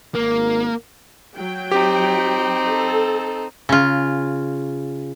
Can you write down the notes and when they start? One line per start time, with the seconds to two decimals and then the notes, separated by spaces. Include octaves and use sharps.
0.15 G#1 A#3 A#4
1.37 F#3 G5
1.72 C4 D#4 G4
2.70 A4
3.69 C#3 F4